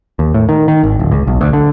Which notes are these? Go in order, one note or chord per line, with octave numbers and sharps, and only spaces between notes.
D#2
A2
D#3
D#3
G#1
D1
C#2
B1
D2
D3